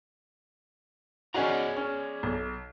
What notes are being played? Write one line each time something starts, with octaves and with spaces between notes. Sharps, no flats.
C#4 D#4 F#4 G#4 D5 A#5
C#4
B1